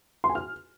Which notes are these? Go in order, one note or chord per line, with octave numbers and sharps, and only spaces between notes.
C6
G#5
F6